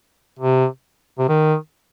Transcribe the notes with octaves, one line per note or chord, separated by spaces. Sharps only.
C3
C3
D#3